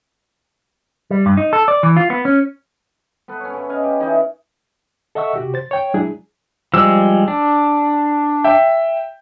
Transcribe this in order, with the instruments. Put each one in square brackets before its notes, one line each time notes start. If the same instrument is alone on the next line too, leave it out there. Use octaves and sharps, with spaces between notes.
[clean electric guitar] G3
G2
D#4
A4
D5
E3
F4
B3
C#4
[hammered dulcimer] B3 A4 B4
C#4 C#5
C#3
D#5 F5 G#5
G4
E3 D#4 G#4
[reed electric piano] A4 D#5 E5 F#5 C#6 E6
C3 F#4 G4
C5 A6
C#5 G5
F#3 G#3 D4 E4 G#4
[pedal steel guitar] F3 G3 G#3 [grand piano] E6
[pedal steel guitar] D4
[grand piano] E5 G5